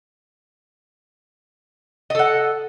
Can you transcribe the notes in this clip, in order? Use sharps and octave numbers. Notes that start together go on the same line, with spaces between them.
A4 D#5 F#5